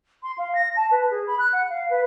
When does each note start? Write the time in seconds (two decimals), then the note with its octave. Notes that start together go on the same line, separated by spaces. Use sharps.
0.23 C6
0.38 F5
0.55 A#6
0.76 A5
0.91 B4
1.10 G#4
1.27 B5
1.39 F#6
1.53 F#5
1.70 F5
1.90 B4